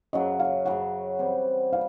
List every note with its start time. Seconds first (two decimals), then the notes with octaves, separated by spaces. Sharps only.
0.13 F#2 C#3 F#3 D#5
0.39 F5
0.65 F#2 C#3 F#3 F#5
1.19 C3 E3 G3 C4
1.73 C3 E3 G3 F5